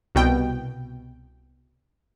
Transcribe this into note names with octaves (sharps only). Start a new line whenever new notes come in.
C2 B2 G5